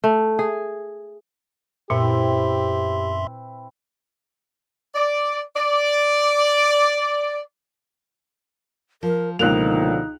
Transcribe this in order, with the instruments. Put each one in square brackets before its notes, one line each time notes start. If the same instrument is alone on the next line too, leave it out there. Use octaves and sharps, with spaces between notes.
[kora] A3
G#4
[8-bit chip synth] F#2 E5 C6 [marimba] A#2 [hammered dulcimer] C4 E4 B4 [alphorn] G4
[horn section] D5
D5
[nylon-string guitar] F3 [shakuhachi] A#4
[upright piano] C#2 F#6 F7 [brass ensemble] B2 D3 F3 [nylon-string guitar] A#3 [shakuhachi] D#4